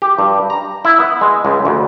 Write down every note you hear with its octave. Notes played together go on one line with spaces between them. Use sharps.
G4
G2
A#5
E4
B3
G#3
C#2
D2